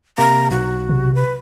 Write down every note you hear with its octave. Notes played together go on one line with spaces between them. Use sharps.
C3 A#3 A#5
B1 F#4
C3
B4